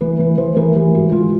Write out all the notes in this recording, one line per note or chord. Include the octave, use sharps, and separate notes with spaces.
E3 B4
E3 B4
E3 C5
E3 A#4
E3 G4
G#2 F#4
E3 F4